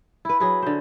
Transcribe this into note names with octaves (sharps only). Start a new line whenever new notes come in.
E4 B4
F#3 G#4 B4
D3 C5